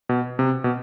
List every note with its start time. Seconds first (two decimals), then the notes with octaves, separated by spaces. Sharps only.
0.09 B2
0.39 C3
0.64 B2